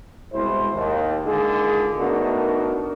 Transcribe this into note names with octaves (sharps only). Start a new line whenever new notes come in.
C2 B2 G#3 E4 C5
D#2
D3 D#3 G#3 F4 G#4
A3 B3 D4 D#4 F#4 A#4